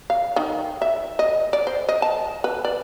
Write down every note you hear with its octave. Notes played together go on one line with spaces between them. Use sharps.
F5
D#3
E5
D#5
D5
C5
D#5
A5
B4
D5